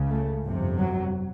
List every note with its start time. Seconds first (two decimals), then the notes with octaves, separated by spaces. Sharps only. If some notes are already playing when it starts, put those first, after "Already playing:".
Already playing: C#2 C#3
0.12 A3
0.44 G1 F2 C3
0.77 F#3